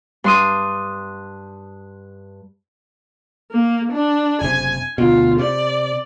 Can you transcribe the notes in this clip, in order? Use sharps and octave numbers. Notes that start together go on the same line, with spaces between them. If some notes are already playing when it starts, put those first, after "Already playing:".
G2 C6 D#6
A#3
D4
F#1 C3 G#5
D2 B2 F4
C3 D5